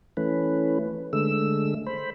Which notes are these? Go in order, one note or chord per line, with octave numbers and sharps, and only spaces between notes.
E3 A3 C#4 B4
D3 G#3 A3 E6
C5 B5